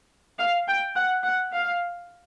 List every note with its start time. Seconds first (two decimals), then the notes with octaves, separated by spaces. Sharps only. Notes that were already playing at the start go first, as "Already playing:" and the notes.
0.39 F5
0.67 G5
0.96 F#5
1.23 F#5
1.51 F5